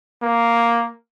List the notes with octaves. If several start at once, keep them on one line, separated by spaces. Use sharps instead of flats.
A#3